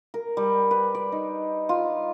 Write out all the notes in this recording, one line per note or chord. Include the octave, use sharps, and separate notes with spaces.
A#4
G3
B4
D5
D#4
F4